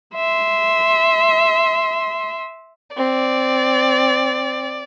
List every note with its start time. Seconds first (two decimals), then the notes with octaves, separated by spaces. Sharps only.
0.14 E5 C6
2.96 C4 D5